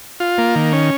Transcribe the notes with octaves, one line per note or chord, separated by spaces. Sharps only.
F4
A#3
D#3
C#4